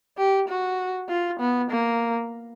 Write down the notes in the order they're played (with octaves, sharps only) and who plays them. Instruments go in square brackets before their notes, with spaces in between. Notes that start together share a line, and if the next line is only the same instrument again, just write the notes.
[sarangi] G4
F#4
F4
B3
A#3